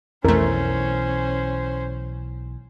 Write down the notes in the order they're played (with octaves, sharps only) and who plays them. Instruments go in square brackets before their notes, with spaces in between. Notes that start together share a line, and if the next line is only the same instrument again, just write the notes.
[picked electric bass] B1 E3 [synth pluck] F2 A3 [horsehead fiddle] C#4 C5 [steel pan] A#4